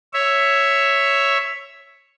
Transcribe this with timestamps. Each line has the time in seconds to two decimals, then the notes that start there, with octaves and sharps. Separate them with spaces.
0.13 C#5 E5